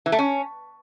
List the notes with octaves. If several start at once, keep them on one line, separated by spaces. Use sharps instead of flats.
E3
A3
C#4